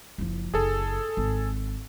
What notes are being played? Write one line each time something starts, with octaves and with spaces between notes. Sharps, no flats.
F#1 F3
F#1 G#4 A4
G#1